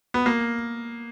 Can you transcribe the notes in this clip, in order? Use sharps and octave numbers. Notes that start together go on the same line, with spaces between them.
B3
A#3